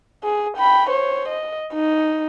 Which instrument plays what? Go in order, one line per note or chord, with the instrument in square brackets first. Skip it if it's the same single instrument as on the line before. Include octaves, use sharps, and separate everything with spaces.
[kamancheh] G#4
G5 B5
C5 C#5
D#5
D#4